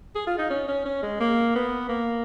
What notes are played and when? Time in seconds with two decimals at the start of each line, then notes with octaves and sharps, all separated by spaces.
0.15 G#4
0.27 F4
0.38 D#4
0.50 C#4
0.68 C#4
0.85 C#4
1.03 G#3
1.20 A#3
1.56 B3
1.89 A#3